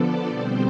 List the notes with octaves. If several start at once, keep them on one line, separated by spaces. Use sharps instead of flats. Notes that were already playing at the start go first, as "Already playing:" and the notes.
Already playing: D3 F3 B3 A4 D5
B2 G3 C4 C5